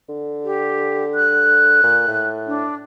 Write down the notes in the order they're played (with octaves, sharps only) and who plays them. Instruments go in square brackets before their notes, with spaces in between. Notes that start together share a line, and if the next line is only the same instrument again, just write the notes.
[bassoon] D3
[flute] G4
F#6
[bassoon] A#2
A2
[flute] D4